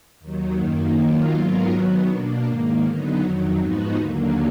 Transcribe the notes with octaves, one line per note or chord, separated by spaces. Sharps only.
D#2 D#3 F#3
F#2 D#3 A#3
D#3 F#3 A#3 F4
G#2 F#3 B3 F4 A#4
D#3 F#3 B3
B2 A#3 D4
G#2 D#3 A#3
D3 F#3 B3 D#4
F2 D#3 F#3
G#2 F3 B3 D#4 F#4
D#2 D3 F#3 A#3